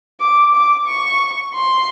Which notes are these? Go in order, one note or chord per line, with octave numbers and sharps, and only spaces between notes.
D6
D6
C#6
C6